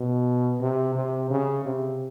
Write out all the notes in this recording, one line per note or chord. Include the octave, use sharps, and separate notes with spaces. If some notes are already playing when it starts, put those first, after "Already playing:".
Already playing: B2
C3
C3
C#3
C3